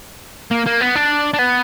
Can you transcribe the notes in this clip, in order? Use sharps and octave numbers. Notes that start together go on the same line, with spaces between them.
A#3
A#3
B3
D4
D4
B3